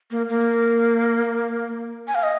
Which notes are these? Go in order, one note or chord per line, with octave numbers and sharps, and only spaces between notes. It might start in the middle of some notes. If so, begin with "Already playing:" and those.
A#3
A#3
G#5
F5
D#5